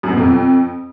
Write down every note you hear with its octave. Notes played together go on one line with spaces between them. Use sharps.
F#2
B2
F2